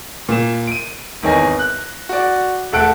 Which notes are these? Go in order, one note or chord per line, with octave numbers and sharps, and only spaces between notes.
A#2 E7
D7 D#7
G#1 E2 D#3 C#5 G#5 A#6
F#6
F#4 D5
E1 A3 A4 F#5 F#6 D7